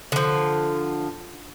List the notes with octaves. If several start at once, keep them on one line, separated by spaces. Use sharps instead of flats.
D3 F3